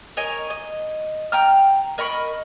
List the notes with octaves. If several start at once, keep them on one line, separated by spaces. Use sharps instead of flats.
A#4 C#5 D#5 G#5
D#5
G5 A#5 F6
A#4 D#5 B5 C#6